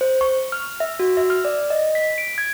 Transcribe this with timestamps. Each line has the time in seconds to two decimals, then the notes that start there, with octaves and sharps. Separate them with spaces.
0.01 C5
0.21 C#6
0.52 F6
0.80 E5
0.99 F#4
1.17 E5
1.30 F6
1.45 D5
1.70 D#5
1.95 B6
2.18 D7
2.38 G#6